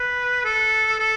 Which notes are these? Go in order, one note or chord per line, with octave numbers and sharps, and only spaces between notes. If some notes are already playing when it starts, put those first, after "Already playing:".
Already playing: B4
A4
A4